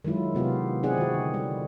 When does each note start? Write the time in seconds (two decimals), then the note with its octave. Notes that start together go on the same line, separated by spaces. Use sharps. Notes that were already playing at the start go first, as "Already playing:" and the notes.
0.05 D#3 F#3 G#3 E4 F4
0.35 C3 B3 F4 G4
0.83 C4 D#4 E4 G#4 D5 F#5
0.98 D#3 F#4
1.14 D3
1.34 G3